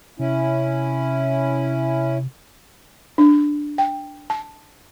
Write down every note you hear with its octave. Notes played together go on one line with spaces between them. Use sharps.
C3 C#4 E4
D4
G5
A5